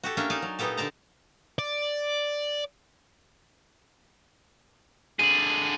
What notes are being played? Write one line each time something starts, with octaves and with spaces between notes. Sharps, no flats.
F#4 G4 A4
A#3 C#4 D4 E5 G5
D#4 D5 G#5 A5
F#3
A#2 B3 D#4 G4 A4
D3 D5 A5 A#5
D5
D3 G#4 D#7 F#7